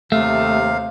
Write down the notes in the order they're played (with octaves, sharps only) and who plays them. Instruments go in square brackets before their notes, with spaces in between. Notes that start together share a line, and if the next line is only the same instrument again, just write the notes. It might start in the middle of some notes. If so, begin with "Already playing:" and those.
[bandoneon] D#2 C3 F5 [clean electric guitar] A3